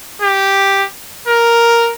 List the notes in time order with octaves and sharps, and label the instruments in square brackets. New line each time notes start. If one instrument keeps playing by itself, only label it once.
[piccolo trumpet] G4
A#4